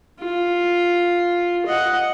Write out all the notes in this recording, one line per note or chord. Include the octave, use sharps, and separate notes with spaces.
F4
D#5 F#5